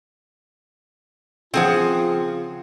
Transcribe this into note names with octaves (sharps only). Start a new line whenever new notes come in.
C#3 F3 C4 F4 G#4 F#5